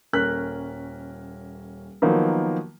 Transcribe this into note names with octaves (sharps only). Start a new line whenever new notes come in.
D#1 C#4 A#4 F#6 B6
D#3 F3 F#3 A#3 B3 D#4